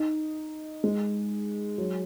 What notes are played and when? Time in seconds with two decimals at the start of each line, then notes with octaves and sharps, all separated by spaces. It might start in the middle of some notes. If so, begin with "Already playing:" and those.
Already playing: D#4
0.84 G#3
1.78 F#3